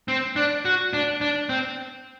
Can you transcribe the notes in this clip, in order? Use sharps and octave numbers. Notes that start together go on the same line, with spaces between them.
C4
D4
F#4
D4
D4
C4